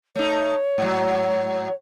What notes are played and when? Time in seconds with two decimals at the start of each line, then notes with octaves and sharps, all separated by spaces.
0.15 A3 D#4 C#5
0.78 G#2 F#3